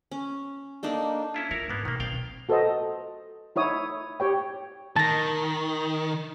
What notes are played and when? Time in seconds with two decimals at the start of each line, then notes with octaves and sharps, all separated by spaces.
0.11 C#4
0.83 A#3 D4 D#4 A4
1.34 C#4 E4 F4
1.51 E4 F4 A#4 C#5
1.69 G#2 C#3 A#3 B3
1.85 B2 D#3 A#3
2.00 D#3 C4 D5 F5 G5
2.49 F#4 A4 B4 C5 D#5
3.56 D#4 E4 C#5 D#6
4.20 G4 C#5 G5
4.96 D#3 A5 A#6